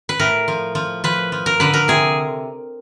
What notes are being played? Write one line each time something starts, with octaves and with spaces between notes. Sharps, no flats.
B4
A2 A#4
F3
F3
F3 B4
F3
A#4
D3 B4
A#4
C3 G#4